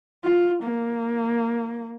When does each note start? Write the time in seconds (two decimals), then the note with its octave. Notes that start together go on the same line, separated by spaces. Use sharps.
0.24 F4
0.63 A#3